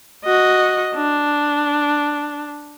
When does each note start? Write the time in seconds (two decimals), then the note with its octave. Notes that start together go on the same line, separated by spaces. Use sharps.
0.25 F#4 D#5
0.96 D4